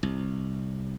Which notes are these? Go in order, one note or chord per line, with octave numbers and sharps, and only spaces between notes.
C2